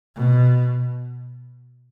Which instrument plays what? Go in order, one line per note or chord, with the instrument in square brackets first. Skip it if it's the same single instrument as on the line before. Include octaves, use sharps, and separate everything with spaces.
[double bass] B2